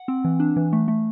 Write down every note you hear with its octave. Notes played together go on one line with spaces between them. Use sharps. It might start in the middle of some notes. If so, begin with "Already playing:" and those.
Already playing: F#5
C4
E3
D4
E3
A3
A3